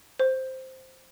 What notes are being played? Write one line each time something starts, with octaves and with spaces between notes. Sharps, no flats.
C5